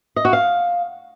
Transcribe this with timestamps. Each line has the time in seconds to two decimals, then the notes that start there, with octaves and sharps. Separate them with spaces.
0.16 D#5
0.25 F#4
0.33 F5